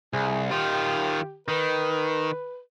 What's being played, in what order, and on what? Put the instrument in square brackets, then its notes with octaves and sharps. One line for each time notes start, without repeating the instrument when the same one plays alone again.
[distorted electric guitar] C2 [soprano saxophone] G#4
[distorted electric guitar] D#3 F4 [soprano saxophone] G4
[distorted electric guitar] D#3 [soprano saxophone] B4